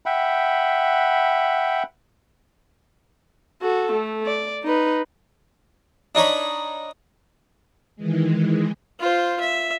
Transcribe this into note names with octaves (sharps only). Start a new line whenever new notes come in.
E5 F#5 G5 B5
F#4 A4
A3
D5
D#4 B4
D4 D#4 C#5 B5
D#3 E3 G#3
F4 C5
E5